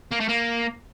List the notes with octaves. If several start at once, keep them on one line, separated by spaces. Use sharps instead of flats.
A#3
A3
A#3